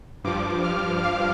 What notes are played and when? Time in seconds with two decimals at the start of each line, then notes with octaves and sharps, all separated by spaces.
0.24 G2 F3 D6
0.64 F6
1.03 F5